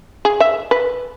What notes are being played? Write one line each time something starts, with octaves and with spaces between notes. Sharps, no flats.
G#4
E5
B4